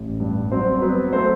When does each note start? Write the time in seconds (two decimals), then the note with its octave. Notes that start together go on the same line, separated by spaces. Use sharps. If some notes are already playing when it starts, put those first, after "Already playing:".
Already playing: A1
0.20 G2
0.52 F#3 C4 C5
0.82 F#3 B3 B4
1.13 A3 C4 C5